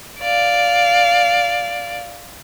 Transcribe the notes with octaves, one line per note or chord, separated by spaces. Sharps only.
D5 F5